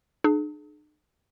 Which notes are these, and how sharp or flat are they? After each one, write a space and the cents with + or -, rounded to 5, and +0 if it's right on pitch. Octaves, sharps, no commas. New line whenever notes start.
D4 +45 G#4 +40